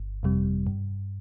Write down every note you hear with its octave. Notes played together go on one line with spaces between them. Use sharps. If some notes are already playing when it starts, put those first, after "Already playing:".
Already playing: G1
F2 C3 G3
G2